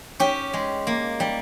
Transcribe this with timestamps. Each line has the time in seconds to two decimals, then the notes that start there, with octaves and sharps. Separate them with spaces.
0.20 C#4 G4
0.53 G#3
0.87 A#3
1.20 G3